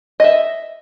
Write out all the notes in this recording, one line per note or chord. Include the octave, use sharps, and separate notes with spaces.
D#5 E5